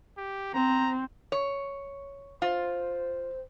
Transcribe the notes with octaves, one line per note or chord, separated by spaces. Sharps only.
G4
C4 A#5
C#5
F4 C5